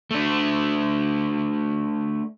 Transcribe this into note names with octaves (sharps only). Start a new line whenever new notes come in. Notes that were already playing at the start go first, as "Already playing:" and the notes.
A3 D4